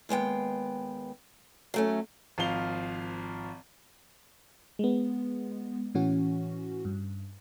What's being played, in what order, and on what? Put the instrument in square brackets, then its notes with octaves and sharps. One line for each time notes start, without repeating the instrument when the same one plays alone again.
[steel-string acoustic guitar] D#2 G#3 B3 G5
F#3 A3 C#4
[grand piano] G#1 F3 F5 G7
[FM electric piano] G#3 B3
A2 E3 C#4 F#4
G2